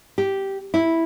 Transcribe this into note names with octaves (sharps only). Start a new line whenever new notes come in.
G4
E4